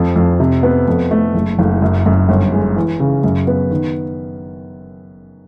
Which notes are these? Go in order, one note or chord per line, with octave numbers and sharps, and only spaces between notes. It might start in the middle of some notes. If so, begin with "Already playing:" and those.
Already playing: F2 F3
F2
C3
B3
F2
A3
F#1
F#1
F#2
F#2
G1
G#3
E3
C#3
F#2
B3
D#3